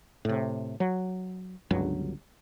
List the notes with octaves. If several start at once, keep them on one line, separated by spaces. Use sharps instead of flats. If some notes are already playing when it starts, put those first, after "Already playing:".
A2 C3
F#3
G1 C#2 G2 F#3